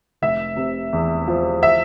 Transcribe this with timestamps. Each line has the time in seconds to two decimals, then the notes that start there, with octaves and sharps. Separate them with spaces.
0.22 F1 E5
0.57 C3
0.93 E2
1.28 F3
1.63 E5